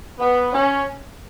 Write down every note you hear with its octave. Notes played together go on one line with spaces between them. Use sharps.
B3
C#4